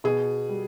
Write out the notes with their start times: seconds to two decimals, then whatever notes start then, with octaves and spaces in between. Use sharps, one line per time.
0.04 B2 G#4
0.49 G3